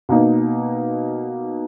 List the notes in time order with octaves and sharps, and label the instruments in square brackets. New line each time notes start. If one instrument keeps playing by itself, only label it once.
[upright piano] B2 A#3 D#4